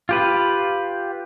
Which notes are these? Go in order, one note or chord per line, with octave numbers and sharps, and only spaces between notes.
F4 G4 B4